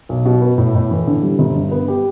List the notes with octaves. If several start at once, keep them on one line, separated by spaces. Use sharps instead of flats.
B1
B2
B3
A2
A2
E3
D3
G3
G1
G2
B3
G4